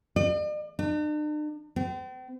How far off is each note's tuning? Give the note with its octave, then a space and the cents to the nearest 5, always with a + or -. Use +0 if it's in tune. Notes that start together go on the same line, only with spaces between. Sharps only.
D5 +45
D4 +45
C4 -40